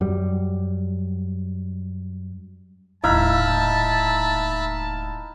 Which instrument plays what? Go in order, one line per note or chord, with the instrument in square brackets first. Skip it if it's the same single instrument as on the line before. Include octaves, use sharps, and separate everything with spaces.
[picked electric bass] F#2 G3
[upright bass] D#1 A2 [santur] D#4 E4 F5 [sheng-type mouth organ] E5 B5 [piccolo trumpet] A5